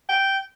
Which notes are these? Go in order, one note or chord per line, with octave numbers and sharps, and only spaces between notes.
G5